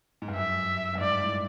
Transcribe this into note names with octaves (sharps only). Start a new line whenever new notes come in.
G#2
G2
F#2 E5
G2
G#2 D5
G2
A2